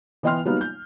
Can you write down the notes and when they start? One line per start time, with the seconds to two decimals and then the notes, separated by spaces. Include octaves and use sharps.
0.23 E3 B3 D#5 G5 C6 F6
0.45 F#3 G3 A#3 B3 D#4
0.61 G6